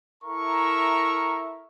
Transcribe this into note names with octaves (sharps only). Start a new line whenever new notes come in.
E4 A4 A#4 E5 A#5 C#6